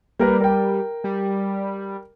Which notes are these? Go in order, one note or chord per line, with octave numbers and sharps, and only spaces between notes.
G3 A#3 A#4 B4
A#4 G5
G3